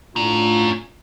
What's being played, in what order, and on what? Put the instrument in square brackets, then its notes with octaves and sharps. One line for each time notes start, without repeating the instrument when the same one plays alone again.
[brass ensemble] A2 D4 F4 [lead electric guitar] C#4 A#5